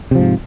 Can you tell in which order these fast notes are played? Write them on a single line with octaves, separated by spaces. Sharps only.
C3 F3 G#2